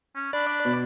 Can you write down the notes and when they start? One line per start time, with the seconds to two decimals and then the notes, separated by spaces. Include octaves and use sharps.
0.16 C#4
0.33 D4 D5 B5
0.65 B2